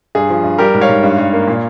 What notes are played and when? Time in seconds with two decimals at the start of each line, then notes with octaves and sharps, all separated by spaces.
0.15 G2 G#4
0.30 F3
0.44 G2
0.58 G3 G4 A#4
0.74 G#2
0.81 C#5 F5
0.89 G#2
1.03 G2
1.18 G2
1.33 A#3
1.47 A#2